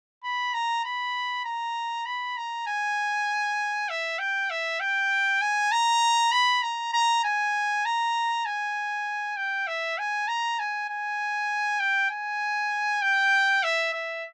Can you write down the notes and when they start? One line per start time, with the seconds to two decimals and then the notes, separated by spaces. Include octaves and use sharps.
0.24 B5
0.54 A#5
0.84 B5
1.45 A#5
2.06 B5
2.37 A#5
2.67 G#5
3.89 E5
4.19 G5
4.50 E5
4.80 G5
5.42 G#5
5.72 A#5
6.32 B5
6.62 A#5
6.94 A#5
7.24 G#5
7.85 A#5
8.46 G#5
9.37 G5
9.67 E5
9.98 G#5
10.28 A#5
10.59 G#5
10.90 G#5
11.80 G5
12.10 G#5
13.02 G5
13.64 E5
13.93 E5